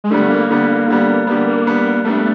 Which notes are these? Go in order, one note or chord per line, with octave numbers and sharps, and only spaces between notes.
G#3
D3 G3 A3 B3
A#3
D3 G3 B3
D3 G3 B3
D3 G3 A#3 B3
A#3
G3 B3 D4
G3 A3 B3 D4